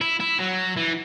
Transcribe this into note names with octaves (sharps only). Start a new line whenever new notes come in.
E4
E4
F#3
E3